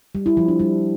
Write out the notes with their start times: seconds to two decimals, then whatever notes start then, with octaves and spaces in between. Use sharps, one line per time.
0.15 G3
0.26 E4
0.37 F3
0.48 D4
0.60 G3